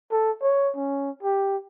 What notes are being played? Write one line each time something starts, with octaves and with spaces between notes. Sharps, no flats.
A4
C#5
C#4
G4